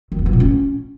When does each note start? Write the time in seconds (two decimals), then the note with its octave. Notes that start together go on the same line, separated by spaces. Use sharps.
0.12 D#3
0.19 B3
0.26 E3
0.33 A#2
0.40 C#4